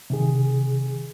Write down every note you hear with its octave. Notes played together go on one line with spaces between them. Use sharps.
C3 D#3 G#4